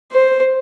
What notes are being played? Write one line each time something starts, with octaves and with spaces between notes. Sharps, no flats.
C5